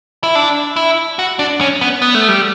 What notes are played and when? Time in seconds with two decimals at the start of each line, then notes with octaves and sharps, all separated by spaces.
0.24 E4
0.35 D4
0.76 E4
1.19 F#4
1.39 D4
1.61 C#4
1.81 B3
2.02 B3
2.15 A3
2.28 G3